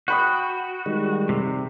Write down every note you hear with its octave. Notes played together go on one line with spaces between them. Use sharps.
F#4 G5 B5 D#6
D#3 G3 G#3
C3